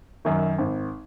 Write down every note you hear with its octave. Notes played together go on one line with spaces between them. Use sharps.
F#2 D#3
G#1